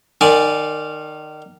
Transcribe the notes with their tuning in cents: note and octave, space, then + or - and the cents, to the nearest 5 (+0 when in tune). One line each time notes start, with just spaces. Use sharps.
D#3 -25 D5 +0 G#5 +0